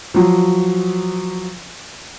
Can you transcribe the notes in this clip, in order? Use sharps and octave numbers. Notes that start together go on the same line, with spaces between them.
F3 F#3